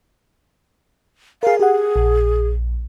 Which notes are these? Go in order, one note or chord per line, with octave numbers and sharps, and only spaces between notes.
G#4 A#4 F5
G4 G#4 F#5
A#1